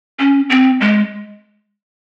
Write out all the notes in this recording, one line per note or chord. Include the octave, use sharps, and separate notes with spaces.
C#4
C4
G#3